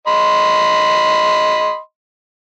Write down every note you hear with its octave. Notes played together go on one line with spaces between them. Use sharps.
D#5 B5 C6